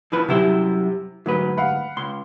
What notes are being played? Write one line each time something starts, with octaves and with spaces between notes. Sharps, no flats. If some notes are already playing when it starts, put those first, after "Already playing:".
E2 E3 F3 B4
F#2 C3 G3 E4 C5
D2 G#2 F#3 B4
F5 F#5 B5
C#2 C6